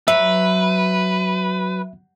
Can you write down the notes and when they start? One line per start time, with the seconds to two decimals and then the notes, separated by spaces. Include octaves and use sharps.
0.08 F#3 B4 E5